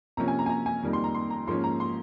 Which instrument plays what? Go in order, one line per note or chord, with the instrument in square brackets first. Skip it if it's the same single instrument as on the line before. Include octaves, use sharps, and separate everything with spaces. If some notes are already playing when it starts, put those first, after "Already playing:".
[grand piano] C3 F3 A#3 C#4 A#5
G#5
A#5
G#5
A#5
G#5
F2 D#3 G3 A#3
C6
A#5
C6
A#5
G#2 F3 A#3 C#4 C6
A#5
C6